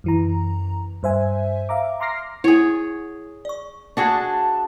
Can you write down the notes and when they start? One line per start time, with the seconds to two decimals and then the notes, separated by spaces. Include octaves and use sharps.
0.04 F#2 E3 A#5
1.03 G2 C5 E5 G#5
1.69 E5 F5 A#5 D6
2.00 A#5 C6 D6 F6 A#6 C7
2.44 E4 G#4 C#5 F#5
3.45 D5 C#6
3.97 D4 F#4 G#4 A5